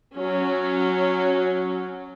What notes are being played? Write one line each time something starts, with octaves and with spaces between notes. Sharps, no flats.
F#3 C#4